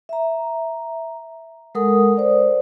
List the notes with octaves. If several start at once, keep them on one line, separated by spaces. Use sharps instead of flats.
E5 A#5
G#3 A4 A#4 F#5 D#6
C5 D5